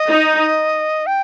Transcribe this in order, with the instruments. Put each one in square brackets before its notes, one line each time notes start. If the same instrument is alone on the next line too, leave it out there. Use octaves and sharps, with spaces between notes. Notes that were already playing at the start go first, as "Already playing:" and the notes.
Already playing: [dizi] D#5
[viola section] D#4
[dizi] G5